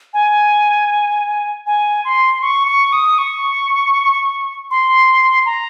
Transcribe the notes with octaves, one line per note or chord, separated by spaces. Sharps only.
G#5
G#5
C6
C#6
C#6
D#6
C#6
C6
A#5